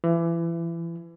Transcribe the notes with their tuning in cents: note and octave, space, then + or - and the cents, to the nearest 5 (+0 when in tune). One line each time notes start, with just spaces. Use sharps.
E3 +30